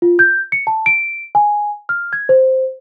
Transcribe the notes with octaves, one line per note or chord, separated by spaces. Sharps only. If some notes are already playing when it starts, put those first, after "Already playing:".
F4
G6
C#7
A5
D7
G#5
F6
G#6
C5